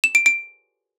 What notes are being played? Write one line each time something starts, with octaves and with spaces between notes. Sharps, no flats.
E7
D7
D7